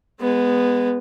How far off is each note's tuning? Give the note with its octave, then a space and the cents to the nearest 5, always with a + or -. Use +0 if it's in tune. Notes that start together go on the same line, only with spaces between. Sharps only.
G#3 -20 B3 +0